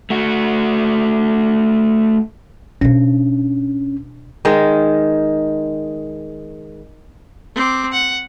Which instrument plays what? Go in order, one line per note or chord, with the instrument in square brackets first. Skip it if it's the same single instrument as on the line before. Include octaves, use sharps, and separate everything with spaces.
[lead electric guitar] A3 F#4
[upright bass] B2 D4 [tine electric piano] C#4
[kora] D#3 G#3
[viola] C4 D6
F#5